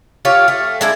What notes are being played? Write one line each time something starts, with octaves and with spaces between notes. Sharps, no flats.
F4 G4 C#5 F5
A3
G#3 D4 E4